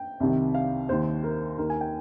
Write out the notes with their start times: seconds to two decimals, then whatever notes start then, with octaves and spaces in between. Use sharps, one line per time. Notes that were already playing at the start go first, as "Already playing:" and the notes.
Already playing: G5
0.20 C2 C3 D#3
0.55 F5
0.89 D#2 D#3 C5
1.23 A#4
1.58 D#2 D#3 A#4
1.70 G#5
1.81 G5